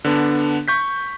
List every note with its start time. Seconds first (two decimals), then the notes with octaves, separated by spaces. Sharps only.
0.05 D3 B3 D4
0.68 C#6 G6 B6